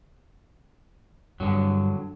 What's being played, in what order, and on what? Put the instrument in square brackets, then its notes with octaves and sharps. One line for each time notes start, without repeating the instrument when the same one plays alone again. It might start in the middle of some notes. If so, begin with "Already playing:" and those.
[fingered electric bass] G2 [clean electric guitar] D3 F#3